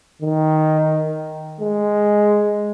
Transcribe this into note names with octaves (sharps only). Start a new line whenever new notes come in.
D#3
G#3